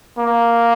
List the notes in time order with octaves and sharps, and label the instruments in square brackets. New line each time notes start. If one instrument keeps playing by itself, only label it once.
[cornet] A#3